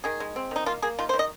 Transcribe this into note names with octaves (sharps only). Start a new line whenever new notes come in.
D#3 G#4
G#3
C4
D#3 D#4
A#3 F4
A#3 G#4
D#3 F4
D#3 C5
D#5